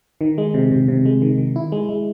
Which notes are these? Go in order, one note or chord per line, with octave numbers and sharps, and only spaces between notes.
D#3
G#3
C3
C3
C3
G#3
D#3
D#3
E4
G#3
G#3